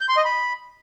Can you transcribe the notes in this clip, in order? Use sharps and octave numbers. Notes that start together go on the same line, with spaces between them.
G6
C6
D#5
B5